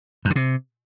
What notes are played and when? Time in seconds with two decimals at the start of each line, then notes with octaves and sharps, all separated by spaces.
0.25 F#2
0.30 D3
0.36 C3